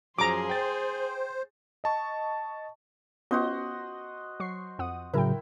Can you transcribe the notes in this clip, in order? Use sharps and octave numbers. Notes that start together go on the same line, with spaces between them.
F#2 F3 G#4 A#5 C6 D6
C5 G5 A6
D#5 A5 C#6
B3 C#4 F4 F#4 C5 D#5
F#3 C#6 C7
F2 F#5 D#6
A2 C#3 F#3 E4 A#4 G5